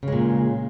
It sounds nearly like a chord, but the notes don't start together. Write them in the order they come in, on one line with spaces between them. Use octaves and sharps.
C#3 G#3 A#2